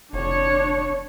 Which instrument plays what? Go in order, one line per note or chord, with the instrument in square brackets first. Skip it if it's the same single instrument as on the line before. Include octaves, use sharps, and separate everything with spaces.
[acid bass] F1 [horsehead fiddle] D4 C#5